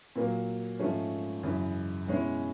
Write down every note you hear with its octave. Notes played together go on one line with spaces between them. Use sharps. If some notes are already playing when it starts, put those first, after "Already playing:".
A#2 F#3 A#3
G#2 F3 A3 C#4
F#2 C#3 E3
B2 G#3 C#4 E4